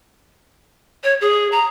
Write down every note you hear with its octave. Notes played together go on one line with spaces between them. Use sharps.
C#5
G#4
A#5